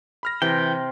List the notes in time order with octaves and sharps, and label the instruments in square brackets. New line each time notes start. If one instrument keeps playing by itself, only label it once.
[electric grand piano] B5 F6 A#6
[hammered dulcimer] C3 [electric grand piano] E3 [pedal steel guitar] G5